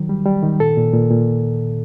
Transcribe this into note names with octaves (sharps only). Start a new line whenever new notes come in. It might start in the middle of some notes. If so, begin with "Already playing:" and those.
Already playing: D#3 F#3
G3
G3
D#3
A#2 A4
A#2
A#2
A#2